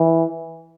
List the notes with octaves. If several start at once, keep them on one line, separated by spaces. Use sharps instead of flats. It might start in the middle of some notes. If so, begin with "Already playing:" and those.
Already playing: E3